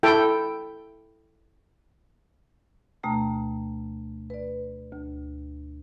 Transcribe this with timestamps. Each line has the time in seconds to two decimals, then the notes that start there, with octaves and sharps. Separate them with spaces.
0.03 E4 A4 G5
3.03 D2 B2 A3 G5 A#5
4.30 B4 D5
4.92 D2